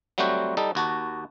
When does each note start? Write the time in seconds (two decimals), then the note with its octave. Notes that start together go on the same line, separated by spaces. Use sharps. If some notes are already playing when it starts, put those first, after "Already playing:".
0.18 F#3 G3 A3 C4 F#4 G5
0.57 G3 D#4 A4
0.75 D#2 F#4 A5